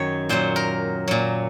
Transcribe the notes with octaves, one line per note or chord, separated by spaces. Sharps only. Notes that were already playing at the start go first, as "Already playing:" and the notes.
Already playing: F#2 D#3 F#3 C#5
A#2 F#3 C5
A#4
A#2 F#3